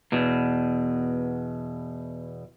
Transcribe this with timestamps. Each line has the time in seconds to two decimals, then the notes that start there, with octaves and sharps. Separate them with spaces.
0.12 E2 B2